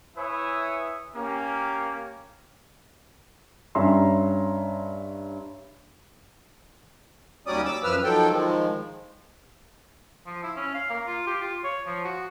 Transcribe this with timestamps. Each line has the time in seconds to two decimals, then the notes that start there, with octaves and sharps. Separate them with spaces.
0.17 E4 B4 C#5 E5 G#5 D#6
1.16 A#3 C#4 G4
3.75 G2 C#4 E5 A#5 C6
7.47 D#2 F#3 G3 C#4 D5 D#6
7.65 D6 E6
7.83 F#2 F3 B4 E6 F6
8.04 D#3 F3 F#3 A4 G5
8.31 D#3 F3 G#3
10.26 F3
10.43 E4
10.56 C#4
10.74 F5
10.90 A#3
11.07 F4
11.27 G4
11.41 F4
11.64 C#5
11.86 F3
12.05 F#4